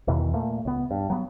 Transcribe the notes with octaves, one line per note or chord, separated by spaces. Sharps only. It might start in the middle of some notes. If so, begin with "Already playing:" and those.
E2 B2 D#3 E3
A#2 A3 A#3
C#2 B3
G2
F#3 B3